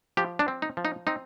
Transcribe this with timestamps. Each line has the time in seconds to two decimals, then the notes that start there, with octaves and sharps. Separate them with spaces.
0.17 F3 G4
0.39 D4
0.48 C4
0.62 D#4
0.77 F3
0.85 D#4
1.07 C4 D#4